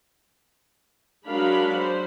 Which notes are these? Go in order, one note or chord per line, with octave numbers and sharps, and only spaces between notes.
F#3 G#3 D4 A#4 F5 B5
C5